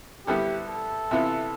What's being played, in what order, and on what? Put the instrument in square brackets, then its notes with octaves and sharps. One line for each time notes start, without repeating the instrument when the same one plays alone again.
[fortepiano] D3 G3 B3 E4 [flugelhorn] G4
[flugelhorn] A4
[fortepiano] C3 E3 B3 F4